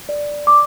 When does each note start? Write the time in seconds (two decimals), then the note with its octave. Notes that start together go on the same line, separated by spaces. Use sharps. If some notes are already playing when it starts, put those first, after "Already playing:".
0.09 D5
0.47 D6